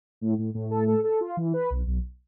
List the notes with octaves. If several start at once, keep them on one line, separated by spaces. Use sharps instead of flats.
A2
A2
A2
A4
A4
A4
F4
E3
B4
B1
B1